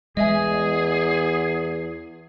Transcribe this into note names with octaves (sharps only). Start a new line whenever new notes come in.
E2 G#3 G#4 D#5 E5 G#5